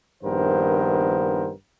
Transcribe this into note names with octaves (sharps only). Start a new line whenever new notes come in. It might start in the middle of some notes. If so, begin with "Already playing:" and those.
A#1 G2 D#3 B3 A#4 C5